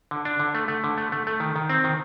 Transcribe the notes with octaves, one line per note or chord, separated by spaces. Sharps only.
D3
D4
D3
A3
A3
D3
A3
A3
A3
D#3
D#3
C4
D#3